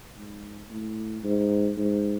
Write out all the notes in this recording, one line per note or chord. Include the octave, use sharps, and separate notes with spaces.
G#2
A2
G#2
G#2